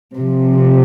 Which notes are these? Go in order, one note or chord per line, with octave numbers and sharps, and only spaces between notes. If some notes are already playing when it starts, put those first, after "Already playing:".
C3 F3